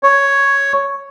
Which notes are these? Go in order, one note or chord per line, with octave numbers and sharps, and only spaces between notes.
C#5